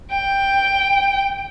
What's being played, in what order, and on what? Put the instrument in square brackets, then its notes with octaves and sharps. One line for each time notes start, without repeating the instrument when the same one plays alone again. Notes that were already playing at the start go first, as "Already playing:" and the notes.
[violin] G5